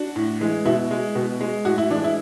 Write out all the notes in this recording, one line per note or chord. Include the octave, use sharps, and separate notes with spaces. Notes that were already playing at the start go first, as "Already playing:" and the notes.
Already playing: D4 F#4
A2
E3 G#3
B2 E4
G#3
B2
G#3
A2 F#4
E4
E3 G#3 D4
E4